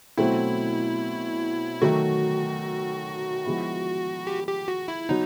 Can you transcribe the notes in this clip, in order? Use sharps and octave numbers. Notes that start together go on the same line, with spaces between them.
B2 F#3 A3 C4 E4
D#3 F#3 A3 F#4
F3 G#3 B3 E4
G4
G4
F#4
E4
F#3 B3 D#4